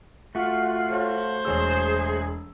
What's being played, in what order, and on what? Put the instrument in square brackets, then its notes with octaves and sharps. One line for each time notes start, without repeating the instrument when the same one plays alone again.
[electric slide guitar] A3 F#4 [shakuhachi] F4
[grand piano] A4 C#5 F5 [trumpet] C5
[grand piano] E1 C#5 E6 [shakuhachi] G#4